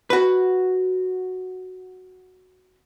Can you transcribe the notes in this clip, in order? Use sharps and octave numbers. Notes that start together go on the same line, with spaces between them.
F#4 B4